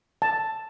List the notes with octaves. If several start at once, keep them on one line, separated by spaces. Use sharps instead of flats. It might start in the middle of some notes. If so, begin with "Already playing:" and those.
A5